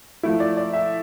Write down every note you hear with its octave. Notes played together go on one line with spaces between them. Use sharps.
F3 A3 E4
D5
D5
E5